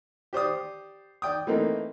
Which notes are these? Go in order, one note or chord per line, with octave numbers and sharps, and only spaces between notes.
G4 C5 D5 D#6
D5 G5 D#6
E3 A3 A#3 C4 D#4